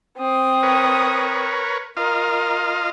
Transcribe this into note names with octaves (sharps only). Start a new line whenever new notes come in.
C4 D#6
A#4 B4 C#5
F4 A#4 D#5 F5